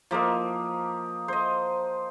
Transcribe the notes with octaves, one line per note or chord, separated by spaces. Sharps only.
F3 A#3 A#4 D#5
C5 D#5